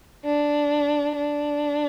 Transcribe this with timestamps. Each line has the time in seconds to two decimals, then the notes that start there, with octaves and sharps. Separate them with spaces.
0.25 D4
1.15 D4